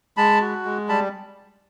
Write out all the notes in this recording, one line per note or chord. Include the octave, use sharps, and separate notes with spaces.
G#3 A5 B5
F#4
G#3
G3 A5 B5